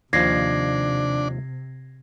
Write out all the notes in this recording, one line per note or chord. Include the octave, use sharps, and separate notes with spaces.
D#2 C3 F3 D4 G#6 A#6 C7